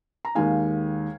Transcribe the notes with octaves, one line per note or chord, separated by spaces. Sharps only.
A#5
D#2 D#3 G#3 D#4 F5 G#5